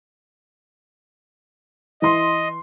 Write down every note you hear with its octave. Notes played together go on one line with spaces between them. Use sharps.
E3 D#5 C6